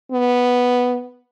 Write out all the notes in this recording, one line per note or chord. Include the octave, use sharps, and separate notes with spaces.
B3